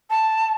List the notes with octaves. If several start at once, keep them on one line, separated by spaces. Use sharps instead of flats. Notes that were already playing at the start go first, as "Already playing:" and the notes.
A5